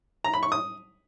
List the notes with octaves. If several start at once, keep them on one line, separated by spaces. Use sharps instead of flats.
A#5
B5
C#6
D#6